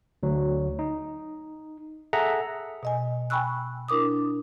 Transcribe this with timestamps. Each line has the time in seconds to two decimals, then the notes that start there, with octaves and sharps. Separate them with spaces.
0.23 D2 F#3
0.79 D#4
2.13 G#4 A4 E5 F#5 A#5
2.83 B2 D#5 G#5
3.30 G5 G#5 B5 C#6 E6 F#6
3.89 D4 E4 A#4 D6 D#6